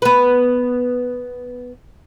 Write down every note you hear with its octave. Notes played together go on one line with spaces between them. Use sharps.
B3 B4